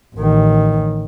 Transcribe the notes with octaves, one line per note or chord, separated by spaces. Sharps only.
A1 D#3